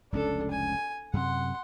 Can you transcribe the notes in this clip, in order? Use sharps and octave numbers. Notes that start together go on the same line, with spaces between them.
F1 C#2 C#4 D4 A4
G#5
F#2 C3 F#5 C6